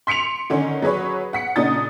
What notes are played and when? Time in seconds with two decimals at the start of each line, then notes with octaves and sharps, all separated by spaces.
0.07 C6 B6 C#7 D7 F7
0.50 D3 D#3 C#4
0.82 F#3 G#4 B4 C#5
1.33 F#5 B6 C#7
1.56 A#2 C#3 D4 D#4 D#6 A6